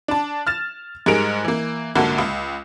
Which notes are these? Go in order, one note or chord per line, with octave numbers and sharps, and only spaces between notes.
D4 A5
F6 A6 E7
G#2 G3 G#4 A#4 D7 F7
E3 A#3
C2 G#2 D3 A#3 F#4 A5
C#2